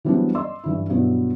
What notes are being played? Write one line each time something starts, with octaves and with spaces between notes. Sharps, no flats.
E3 F#3 G3 B3 C4 D4
D5 D#5 C6 E6
G2 E3 E4
G2 B2 F#3 B3 E4